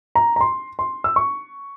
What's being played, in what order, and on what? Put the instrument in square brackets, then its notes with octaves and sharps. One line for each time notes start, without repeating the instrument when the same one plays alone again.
[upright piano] A#5
A#5
C6
C6
E6
C#6